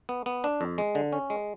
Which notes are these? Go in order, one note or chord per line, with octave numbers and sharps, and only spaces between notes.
B3
B3
D4
F2
G#3
D3
C#4
G#3